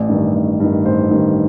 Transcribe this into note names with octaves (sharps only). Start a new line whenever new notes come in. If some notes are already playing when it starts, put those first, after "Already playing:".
Already playing: A1 D5
G2 D#3
A1
G2 D#3
A1 C5
G2 D#3